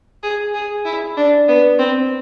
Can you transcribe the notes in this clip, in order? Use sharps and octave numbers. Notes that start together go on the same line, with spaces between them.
G#4
G#4
E4
D4
B3
C4